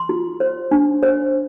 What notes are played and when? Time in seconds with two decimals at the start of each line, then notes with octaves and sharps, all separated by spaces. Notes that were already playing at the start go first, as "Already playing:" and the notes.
Already playing: C6
0.09 F4
0.40 C5
0.71 D4
1.03 C5